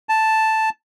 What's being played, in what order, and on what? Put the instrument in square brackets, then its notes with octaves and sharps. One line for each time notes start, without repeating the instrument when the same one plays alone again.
[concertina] A5